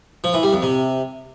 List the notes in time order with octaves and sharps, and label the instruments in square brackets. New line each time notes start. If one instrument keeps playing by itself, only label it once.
[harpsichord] F3
E3
G3
F2
C3